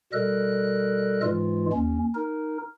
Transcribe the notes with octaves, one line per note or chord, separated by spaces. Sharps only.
B2 G3 A4 A#4 D#5 F#6
G#2 E3 G#3 F4
D#2 C#4
D#4 A#4